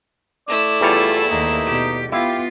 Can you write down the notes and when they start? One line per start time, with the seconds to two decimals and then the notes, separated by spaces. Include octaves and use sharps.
0.48 A3 E4 D5
0.81 E2 G3 F4 A4 C#5
1.29 D#2 A#3 D#4
1.66 B2 G4
2.12 B3 E4 F4 G4 F5